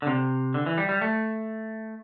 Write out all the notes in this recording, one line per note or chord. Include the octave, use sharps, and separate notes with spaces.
D3
C3
D3
E3
G3
G3
A3